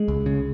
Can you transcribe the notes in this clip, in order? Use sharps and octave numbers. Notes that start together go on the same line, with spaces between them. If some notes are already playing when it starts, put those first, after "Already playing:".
Already playing: G#3
C#2
C#3